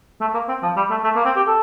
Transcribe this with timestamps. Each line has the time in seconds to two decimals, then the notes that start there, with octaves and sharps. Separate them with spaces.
0.21 A3
0.34 A#3
0.48 C4
0.63 F3
0.76 G3
0.91 A3
1.04 A3
1.16 A#3
1.25 C4
1.36 G4
1.47 A4